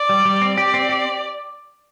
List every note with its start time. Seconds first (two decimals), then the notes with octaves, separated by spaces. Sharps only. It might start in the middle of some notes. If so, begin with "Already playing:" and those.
Already playing: D5
0.09 G3
0.25 G3
0.42 C4
0.58 G4 D5
0.74 C4
0.89 G4